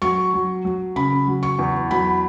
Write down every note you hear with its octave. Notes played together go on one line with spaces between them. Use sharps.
F#3 C#6
F#3
F#3
C#3 B5
F#3
C#6
E2
F#3 B5